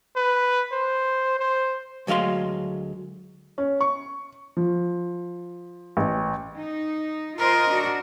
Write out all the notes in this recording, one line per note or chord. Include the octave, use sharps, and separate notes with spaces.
B4
C5
C5
D2 F#3 G#3 F5 C6
C#4
C#6
F3
A1
D#4
F4 A#4 C5 D#5
D4 F#4